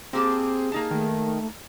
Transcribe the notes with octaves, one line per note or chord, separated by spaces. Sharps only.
A#3 C4 G4 G#4 A5
A#3 D#4 A5
D#3 A3